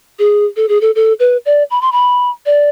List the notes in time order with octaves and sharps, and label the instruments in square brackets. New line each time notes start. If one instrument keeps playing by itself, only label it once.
[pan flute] G#4
A4
G#4
A4
A4
B4
D5
B5
C6
B5
D5